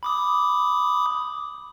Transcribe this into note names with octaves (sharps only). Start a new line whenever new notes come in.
B5 D6 D#6